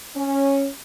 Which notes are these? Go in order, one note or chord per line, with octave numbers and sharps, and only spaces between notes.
C#4